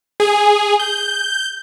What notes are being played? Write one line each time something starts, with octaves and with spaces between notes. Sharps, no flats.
G#4
G6